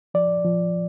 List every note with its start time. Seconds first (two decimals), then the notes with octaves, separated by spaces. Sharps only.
0.14 F3 D5
0.45 F3